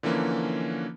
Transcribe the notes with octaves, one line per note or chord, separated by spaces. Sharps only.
D3 E3 F3 A#3 C#4